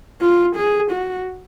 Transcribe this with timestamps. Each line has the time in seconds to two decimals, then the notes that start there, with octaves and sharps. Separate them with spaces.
0.21 F4
0.56 G#4
0.91 F#4